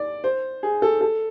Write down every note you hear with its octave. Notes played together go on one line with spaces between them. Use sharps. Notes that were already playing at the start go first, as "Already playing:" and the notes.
Already playing: D5
C5
G#4
A4
A4